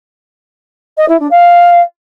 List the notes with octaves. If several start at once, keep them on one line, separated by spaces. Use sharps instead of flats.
D#5
E4
D4
F5